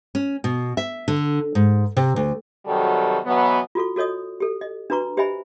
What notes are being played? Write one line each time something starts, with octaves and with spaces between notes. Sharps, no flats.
C#4
B2
E5
D3
G#2
C3
D2
C3 D#3 F#3 G3 F#4 A4
B2 E3 F#3 B3
F4 F#4 A4 C#6
F#4 A4 C#5 D#5 D#6
G4 A4
D#5
D4 F#4 B4 A#5 C#6
G4 C5 D#5 E5 G#5 B5